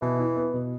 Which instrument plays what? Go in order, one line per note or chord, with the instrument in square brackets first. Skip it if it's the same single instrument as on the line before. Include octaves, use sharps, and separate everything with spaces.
[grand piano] B2 [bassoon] E3
[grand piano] E4
B3
B2